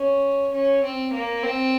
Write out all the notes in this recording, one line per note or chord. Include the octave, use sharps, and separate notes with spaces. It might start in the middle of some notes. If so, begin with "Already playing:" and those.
Already playing: C#4
C#4
C4
A#3
C4